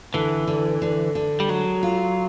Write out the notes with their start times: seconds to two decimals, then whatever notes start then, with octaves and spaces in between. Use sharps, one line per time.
0.14 D3 E3
0.47 D3
0.82 D3
1.15 D3
1.40 G3
1.49 F#3 G#3
1.83 F4